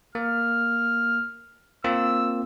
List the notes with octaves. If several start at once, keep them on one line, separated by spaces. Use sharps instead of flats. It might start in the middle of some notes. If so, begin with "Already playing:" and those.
A#3 F6
A#3 C4 F4 E6